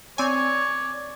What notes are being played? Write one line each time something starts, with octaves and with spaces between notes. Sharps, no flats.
C4 C#5 D5 G#5